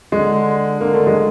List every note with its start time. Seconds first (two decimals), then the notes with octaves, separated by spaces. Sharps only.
0.12 D3 G#3
0.81 D3 A#3
0.94 A3
1.07 G#3